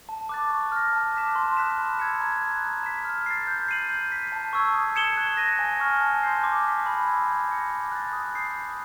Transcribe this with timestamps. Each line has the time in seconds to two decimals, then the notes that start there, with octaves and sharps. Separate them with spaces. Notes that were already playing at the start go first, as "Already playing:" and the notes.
0.09 A5
0.29 D6 F#6 A6
0.50 C#6
0.72 F6 A#6
0.93 A5
1.14 D6 F#6 B6 E7
1.35 C6
1.57 D#6 F#6 B6 E7
1.78 B5
1.99 E6 G#6 C#7 E7
2.20 A#5
2.42 D#6 F#6
2.63 F#6
2.84 B6 E7
3.05 F6
3.26 A6 C7
3.47 G6
3.68 C7 D#7 F#7
3.89 G6
4.11 B6 D#7
4.32 A5
4.53 C#6 E6 G#6
4.74 D#6
4.96 G#6 C#7 E7 G7
5.17 F#6
5.37 A#6 D#7
5.59 G#5
5.80 C#6 F6
6.01 A5
6.23 C6 D#6 G6 C7
6.44 D6
6.65 F#6 B6
6.86 B5
7.07 E6 G#6
7.28 G6
7.50 A#6 C#7
7.71 D6
7.92 F#6 A6
8.13 D#6
8.35 G6 C7
8.55 D#6